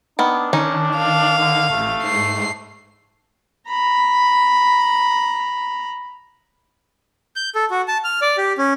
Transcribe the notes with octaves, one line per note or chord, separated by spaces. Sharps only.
D#3 B3 D4
D#3 C#4 D#4
F5
D3
A1 A3
G#2 C7
A#5 B5
G6
A4
F#4
A5
F6
D5
G4
C#4